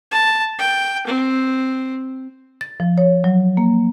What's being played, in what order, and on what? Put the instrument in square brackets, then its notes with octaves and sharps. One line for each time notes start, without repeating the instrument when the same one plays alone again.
[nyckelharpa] A5
G5
C4
[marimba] A6
F3
C#5
F#3
A#3